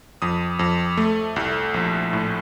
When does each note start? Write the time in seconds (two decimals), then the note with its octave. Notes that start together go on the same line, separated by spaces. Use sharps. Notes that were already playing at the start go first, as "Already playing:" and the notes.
0.22 F2 D#6
0.59 F2
0.97 A3
1.36 C2
1.74 A#1
2.13 A2